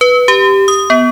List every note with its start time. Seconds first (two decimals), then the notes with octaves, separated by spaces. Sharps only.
0.01 B4
0.28 G4
0.68 D#6
0.90 B3